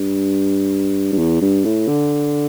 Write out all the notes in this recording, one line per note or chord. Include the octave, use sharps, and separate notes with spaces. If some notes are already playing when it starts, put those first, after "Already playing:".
Already playing: G2
G2
E2
G2
A2
D3